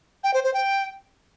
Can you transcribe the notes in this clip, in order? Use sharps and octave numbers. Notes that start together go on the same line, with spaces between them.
G5
C5
C5
G5